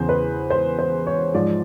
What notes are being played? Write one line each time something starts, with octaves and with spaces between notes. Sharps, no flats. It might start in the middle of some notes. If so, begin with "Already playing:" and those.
Already playing: E2 C#3 E3 C5
B4
C5
C5
C#5
G#2 F3 D5